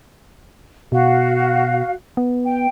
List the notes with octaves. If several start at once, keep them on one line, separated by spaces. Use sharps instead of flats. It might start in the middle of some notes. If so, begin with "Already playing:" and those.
B2 F#4 F5
B3
G5